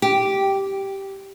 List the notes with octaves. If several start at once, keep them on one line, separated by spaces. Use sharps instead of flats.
G4